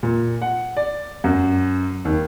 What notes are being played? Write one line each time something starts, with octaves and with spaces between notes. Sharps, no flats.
A#2
F#5
D5
F#2
D#2